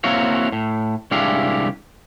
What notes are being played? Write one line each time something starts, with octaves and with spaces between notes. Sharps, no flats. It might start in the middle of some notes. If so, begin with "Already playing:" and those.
A#3 C4 E4 F#4 C#5 F5
A2
C2 G#3 D4 E4 G4 F5